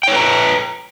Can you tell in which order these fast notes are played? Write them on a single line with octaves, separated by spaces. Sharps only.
G5 C#5 B4 A#5